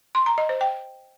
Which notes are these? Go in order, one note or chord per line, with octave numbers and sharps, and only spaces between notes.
C6
A#5
D#5
C5
G5